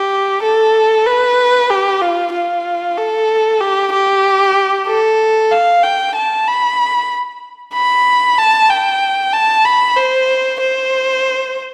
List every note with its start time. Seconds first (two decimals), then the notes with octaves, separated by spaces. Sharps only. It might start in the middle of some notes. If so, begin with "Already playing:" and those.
Already playing: G4
0.43 A4
1.06 B4
1.70 G4
2.02 F4
2.33 F4
2.97 A4
3.61 G4
3.93 G4
4.87 A4
5.51 F5
5.83 G5
6.15 A5
6.47 B5
7.74 B5
8.38 A5
8.70 G5
9.33 A5
9.65 B5
9.97 C5
10.61 C5